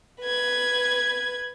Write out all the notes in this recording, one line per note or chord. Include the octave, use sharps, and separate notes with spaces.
B4 G#6